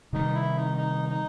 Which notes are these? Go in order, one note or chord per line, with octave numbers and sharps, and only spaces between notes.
C3 D#3 G3 D#4
E4
D#4
D#4
D#4